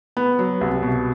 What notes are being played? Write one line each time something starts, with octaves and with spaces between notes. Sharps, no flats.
B3
F#3
C2
B2